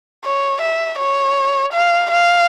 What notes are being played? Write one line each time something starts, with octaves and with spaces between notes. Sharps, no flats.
C#5
E5
C#5
F5
F5